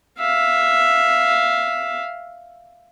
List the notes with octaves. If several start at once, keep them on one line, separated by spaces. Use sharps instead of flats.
E5 F5